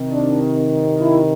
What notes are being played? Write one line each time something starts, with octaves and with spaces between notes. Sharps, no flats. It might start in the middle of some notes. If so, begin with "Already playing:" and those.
Already playing: C3 D#3
D4
E4